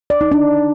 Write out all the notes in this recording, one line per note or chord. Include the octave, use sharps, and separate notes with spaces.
D5
D#4
D4